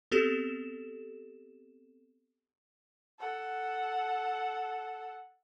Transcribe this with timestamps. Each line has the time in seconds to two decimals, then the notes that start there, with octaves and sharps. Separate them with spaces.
0.12 B3 C4 G4 A4 E7
3.20 A4 F#5